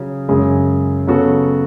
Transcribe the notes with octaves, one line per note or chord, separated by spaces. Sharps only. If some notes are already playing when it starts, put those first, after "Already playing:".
Already playing: C#3 F#3 C#4 G#4
F#2 C#3 G#3
C#3 F#3 B3 F#4 A4